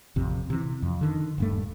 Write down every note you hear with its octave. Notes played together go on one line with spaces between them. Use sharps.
A1 F2 C3
C3 E3
F2
D3 D#3
D#1 G2 A3